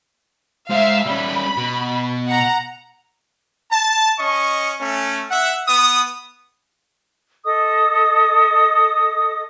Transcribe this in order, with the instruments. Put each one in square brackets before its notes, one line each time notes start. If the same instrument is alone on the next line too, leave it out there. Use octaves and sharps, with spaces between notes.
[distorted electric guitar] G#3 C5 [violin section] E5 F5
[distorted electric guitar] G3 C#4 [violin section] B5
[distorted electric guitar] B2
[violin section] F#5 A#5
[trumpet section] A5
C#4 D#5 C#6
A3 C#4
E5 F#5
B3 D#6
[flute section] A4 D#5 D#6